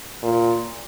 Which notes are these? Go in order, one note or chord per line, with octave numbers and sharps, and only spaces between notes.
A#2